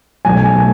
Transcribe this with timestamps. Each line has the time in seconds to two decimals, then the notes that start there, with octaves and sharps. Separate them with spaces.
0.25 B1 G#5
0.55 A3